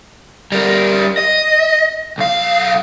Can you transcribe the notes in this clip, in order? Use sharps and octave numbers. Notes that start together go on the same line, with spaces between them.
G3 A#4
D#5
B1 F5